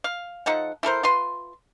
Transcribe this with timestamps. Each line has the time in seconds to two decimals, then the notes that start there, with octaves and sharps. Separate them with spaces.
0.04 F5
0.46 F3 D#4 A4 F#5
0.83 E4 A4 A#4 C5
1.03 F4 B4 C6